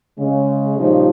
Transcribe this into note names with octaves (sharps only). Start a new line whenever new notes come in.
C#3 G#3
A#2 C#3 F3 G3 D#4